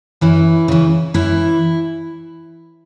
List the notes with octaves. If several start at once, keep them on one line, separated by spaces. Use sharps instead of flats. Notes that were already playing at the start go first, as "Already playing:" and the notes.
F#2 E3 E4
C#3 E3
F#2 E3 E4